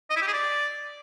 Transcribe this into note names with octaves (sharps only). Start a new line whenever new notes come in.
D#5
E4
G4
G#4
D5